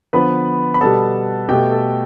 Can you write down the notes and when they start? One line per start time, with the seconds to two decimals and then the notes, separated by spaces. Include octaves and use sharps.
0.13 D3 F3 B3 B4 B5
0.74 B5
0.81 B2 G3 B3 A4 A5
1.48 B2 A3 G4 G5
1.72 A4